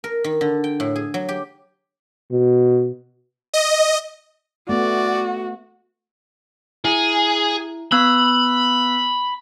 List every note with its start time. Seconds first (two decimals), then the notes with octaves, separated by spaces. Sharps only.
0.04 A#4
0.24 D#3
0.41 D3
0.64 G5
0.80 A2
0.96 G#4
1.14 F#3
1.29 G4
2.31 B2
3.54 D#5
4.69 A3 B3 F#4 D5
6.85 E4 G#4
7.92 B3 B5 E6 F#6